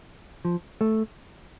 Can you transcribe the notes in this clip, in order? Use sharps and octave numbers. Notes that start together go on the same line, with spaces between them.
F3
A3